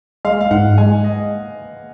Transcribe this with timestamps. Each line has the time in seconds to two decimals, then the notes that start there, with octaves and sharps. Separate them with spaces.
0.25 G#3 F5
0.41 F5
0.51 G#2 F#5
0.78 G#3 G#5
1.04 D#5